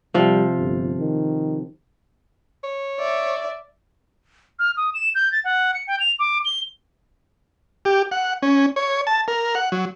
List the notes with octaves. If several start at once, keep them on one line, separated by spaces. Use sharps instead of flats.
C3 F3 G3
G1
D#3
C#5
D5 E5
F6
D#6
E7
G6
A6
F#5
C#7
G5
F7
D6
G7
G4
F#5
C#4
C#5
A5
A#4
F#5
F#3